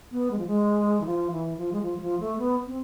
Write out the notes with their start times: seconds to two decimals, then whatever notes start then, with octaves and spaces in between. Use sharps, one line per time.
0.12 B3
0.31 G#3
0.39 F3
0.47 G#3
1.01 E3
1.06 F3
1.31 E3
1.57 F3
1.73 G#3
1.82 F3
1.97 G#3
2.02 F3
2.20 A3
2.39 B3
2.67 C4